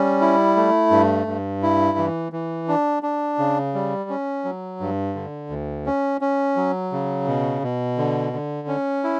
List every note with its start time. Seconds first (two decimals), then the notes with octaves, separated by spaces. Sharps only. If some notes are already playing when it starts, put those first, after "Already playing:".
Already playing: G3 C#4
0.21 E4
0.56 A3
0.91 G2
1.27 G2
1.62 E4
1.98 E3
2.32 E3
2.68 D4
3.03 D4
3.39 C#3
3.74 G3
4.10 C#4
4.45 F#3
4.80 G2
5.15 D3
5.50 D2
5.86 C#4
6.21 C#4
6.56 F#3
6.92 C#3
7.27 B2
7.62 B2
7.98 D3
8.33 D3
8.68 C#4
9.04 E4